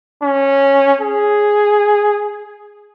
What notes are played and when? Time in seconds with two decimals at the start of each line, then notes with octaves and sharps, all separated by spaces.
0.23 C#4
1.01 G#4